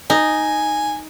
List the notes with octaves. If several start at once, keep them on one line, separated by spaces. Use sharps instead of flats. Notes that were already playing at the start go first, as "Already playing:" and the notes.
D#4 G#5